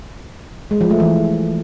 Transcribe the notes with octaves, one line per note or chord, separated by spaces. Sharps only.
G#3
F3
A3
E3